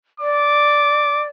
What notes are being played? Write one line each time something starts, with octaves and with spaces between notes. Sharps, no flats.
D5 D6